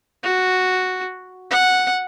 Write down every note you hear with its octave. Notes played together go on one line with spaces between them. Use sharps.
F#4
F#5